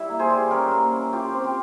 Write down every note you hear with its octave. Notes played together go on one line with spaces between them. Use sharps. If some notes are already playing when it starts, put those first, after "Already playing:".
Already playing: G3 E4 E5
A#3
G#4 C5
G3
C#4 G4 A#4
A#3
C#4
F4 G4
C4
G4